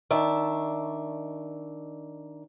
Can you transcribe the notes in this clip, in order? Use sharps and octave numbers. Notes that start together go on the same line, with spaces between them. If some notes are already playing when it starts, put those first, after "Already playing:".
D#3 D4 E5